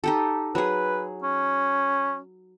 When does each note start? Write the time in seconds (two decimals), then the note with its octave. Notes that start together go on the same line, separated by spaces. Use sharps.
0.04 D#4 G4 A4
0.55 F#3 G#4 B4
1.23 C#4